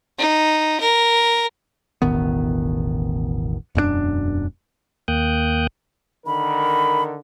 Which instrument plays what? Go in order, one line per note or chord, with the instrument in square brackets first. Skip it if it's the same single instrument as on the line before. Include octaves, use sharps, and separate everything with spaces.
[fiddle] D#4
A#4
[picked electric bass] E1 A1 D#3 B3
E1 F#2 G#3 D4
[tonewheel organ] D#2 A#3 G5 D#6 F#6 G6
[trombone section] D3 D#3 A#4 [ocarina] B5